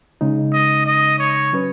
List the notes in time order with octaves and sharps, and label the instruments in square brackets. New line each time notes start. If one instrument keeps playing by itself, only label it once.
[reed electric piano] C#3 G#3 D#4
[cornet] D#5
D#5
C#5
[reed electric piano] F#3 C#4 B4